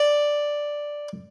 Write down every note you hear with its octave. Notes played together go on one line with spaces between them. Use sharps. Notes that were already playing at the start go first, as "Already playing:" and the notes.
Already playing: D5